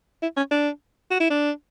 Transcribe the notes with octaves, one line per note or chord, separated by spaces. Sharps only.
E4
C#4
D4
F#4
E4
D4